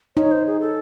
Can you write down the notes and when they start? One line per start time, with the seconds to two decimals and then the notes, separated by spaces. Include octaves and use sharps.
0.17 D#4 C#5
0.31 C5
0.46 G#4
0.61 A4